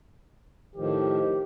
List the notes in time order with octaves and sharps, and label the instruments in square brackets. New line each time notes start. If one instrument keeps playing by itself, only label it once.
[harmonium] A2 D#3 F3 [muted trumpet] G4